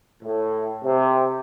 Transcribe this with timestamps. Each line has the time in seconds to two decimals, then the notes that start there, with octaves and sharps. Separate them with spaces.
0.23 A2
0.83 C3